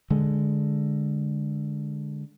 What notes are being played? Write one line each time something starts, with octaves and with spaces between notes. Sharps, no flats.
D3 G#3